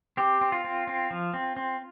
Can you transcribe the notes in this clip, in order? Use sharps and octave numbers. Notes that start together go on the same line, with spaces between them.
C4 G4
C4
F4
C4
C4
F3
C4
C4